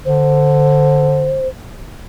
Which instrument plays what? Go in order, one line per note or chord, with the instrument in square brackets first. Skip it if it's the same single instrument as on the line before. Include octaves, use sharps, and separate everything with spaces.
[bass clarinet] D3 [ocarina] C5